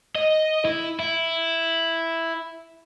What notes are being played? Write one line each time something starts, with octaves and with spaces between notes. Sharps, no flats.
D#5
E4
E4